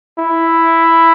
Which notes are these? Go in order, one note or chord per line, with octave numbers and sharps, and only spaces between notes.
E4